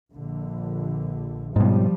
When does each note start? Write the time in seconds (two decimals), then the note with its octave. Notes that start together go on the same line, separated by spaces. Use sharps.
0.13 A#1 D3
1.56 G#2 B2 F3 G3